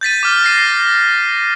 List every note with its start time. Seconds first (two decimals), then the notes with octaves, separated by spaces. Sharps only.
0.01 G6 A6 B6 D#7
0.23 D6 F6
0.44 A#6 C7 D#7